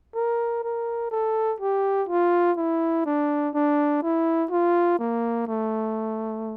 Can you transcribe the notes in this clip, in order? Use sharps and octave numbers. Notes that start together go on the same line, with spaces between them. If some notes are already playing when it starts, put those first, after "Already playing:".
A#4
A#4
A4
G4
F4
E4
D4
D4
E4
F4
A#3
A3